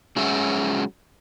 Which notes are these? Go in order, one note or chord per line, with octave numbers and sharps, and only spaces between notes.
F#3 G#3 C#4 F#4 G#4 E5